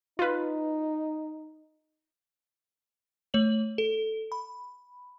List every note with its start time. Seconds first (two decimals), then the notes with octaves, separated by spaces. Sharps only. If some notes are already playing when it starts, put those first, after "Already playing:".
0.19 D#4 F4 B4
3.34 A3 C#5 F#7
3.78 A4
4.32 B5